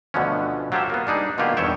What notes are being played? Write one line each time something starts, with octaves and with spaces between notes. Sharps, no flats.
D2 B2 D3 F3 B3 C#4
F#3 F4 G4 A4 C5 E5
A#3 B3
G3 D4 D#4 G#4
B2 D3 A#3 F4 G4 G#4
E2 G2 D#3 C#5 E5 G5